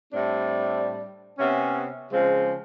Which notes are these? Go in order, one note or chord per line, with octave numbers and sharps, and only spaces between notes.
A2 G3 C4 D4
C3 B3 C#4
C#3 F3 G#3 C4